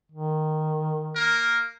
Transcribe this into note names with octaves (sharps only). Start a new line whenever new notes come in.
D#3
A#3 A#4